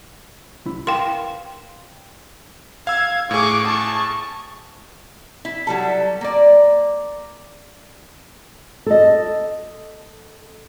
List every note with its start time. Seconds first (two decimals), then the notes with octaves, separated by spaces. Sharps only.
0.66 C2 E4
0.87 A#4 B4 F5 G5 C6
2.87 F5 E6 G#6
3.31 A2 G#4 C#6 D6
3.65 A5 C#6
5.45 E4
5.67 F#3 G3 A4
6.21 A#3 D5
8.86 A4 D#5